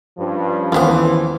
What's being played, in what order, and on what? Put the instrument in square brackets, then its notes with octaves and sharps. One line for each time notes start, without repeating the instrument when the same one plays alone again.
[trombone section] G2 [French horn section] F3 C#4
[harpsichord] D#2 C5 [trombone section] E3 [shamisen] B3 E4 F4